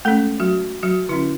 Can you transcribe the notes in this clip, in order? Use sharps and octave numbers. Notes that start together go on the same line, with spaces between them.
G#3 A3 C#4 A4
F#3 F#4
F#3 F#4
D3 F#3 C#4 E4